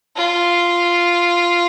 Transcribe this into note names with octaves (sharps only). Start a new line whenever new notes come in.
F4